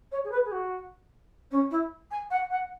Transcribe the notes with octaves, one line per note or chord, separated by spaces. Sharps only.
C#5
G#4
B4
G#4
F#4
C#4
E4
G#5
F#5
F#5